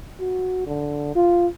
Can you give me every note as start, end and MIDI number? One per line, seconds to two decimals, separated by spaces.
0.20 0.62 66
0.66 1.15 50
1.16 1.48 65